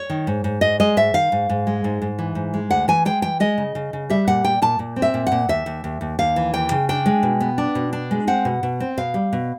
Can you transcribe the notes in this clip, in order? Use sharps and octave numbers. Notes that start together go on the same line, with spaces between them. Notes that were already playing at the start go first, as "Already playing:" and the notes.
Already playing: C#5
D#3
G#2
G#2
G#2 D#5
G#3 D#5
G#2 E5
D#3 F5
G#2
G#2
G#3
G#2
G#2
E3
G#2
G#3
D2 F#5
E3 G#5
G#3 G5
E3 G5
G#3 D#5
C#3
C#3
C#3
G3 E5
A#2 F#5
A#2 G5
A#2 A5
A#2
C4
E5
A#2
F#5
A#2
D#2 E5
D#2
D#2
D#2
D#2 F5
E3
D#2 G5
C#3
D4 G5
G#3
B2
B3
D4
B2
D4
G#3
C4 F#5
B2
B2
C4
B2 F5
G3
B2